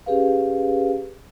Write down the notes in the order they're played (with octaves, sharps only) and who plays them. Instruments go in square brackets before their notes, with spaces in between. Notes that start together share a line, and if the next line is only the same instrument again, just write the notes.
[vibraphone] C#4 G4 G#4 B4 F5